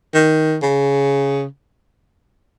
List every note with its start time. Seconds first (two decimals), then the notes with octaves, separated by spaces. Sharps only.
0.15 D#3
0.63 C#3